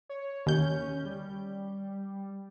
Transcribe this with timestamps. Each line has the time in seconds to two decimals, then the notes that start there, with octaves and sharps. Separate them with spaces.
0.09 C#5
0.46 D#2 C#4 G6
1.05 G3